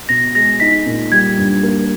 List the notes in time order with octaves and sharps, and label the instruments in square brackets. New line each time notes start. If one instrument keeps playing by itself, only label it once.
[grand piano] B2 [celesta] A#6
[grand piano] G#3 [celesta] A#6
[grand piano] D#4 [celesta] B6
[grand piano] A#2
[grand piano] G3 [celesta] G#6
[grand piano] G2
A#3